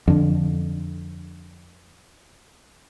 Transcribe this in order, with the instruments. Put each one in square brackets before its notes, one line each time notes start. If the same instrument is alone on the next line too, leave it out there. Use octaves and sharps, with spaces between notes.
[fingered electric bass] F2 D3